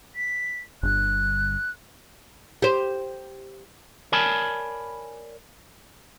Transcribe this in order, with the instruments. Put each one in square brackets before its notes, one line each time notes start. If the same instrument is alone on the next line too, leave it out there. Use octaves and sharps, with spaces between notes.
[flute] B6
[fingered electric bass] G1 G2 [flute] F#6
[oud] G4 C5
[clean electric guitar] A#4 C#5 D5 G#5 A5 B5